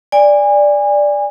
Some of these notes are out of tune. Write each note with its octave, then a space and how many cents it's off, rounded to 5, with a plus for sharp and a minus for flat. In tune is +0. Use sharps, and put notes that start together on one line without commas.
D5 +0 G#5 -30